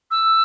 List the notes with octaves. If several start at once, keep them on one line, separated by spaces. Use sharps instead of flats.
E6